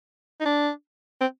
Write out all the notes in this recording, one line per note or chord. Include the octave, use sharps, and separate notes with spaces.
D#4
D4
C4